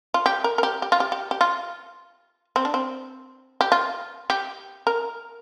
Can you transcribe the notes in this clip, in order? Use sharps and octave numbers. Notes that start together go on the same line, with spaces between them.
F4
G4
A#4
A#4
G4
G4
F4
G4
G4
G4
F4
C4
D4
C4
G4
F4
G4
A#4